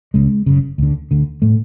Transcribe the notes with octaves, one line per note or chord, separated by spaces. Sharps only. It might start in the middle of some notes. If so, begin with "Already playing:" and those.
C#2 C#3 G#3
F#1 F#2 C#3
D2 D3
D2 D3
A2 A3